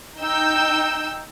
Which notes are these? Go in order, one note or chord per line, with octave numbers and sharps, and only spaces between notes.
D#4 G5 E6 G6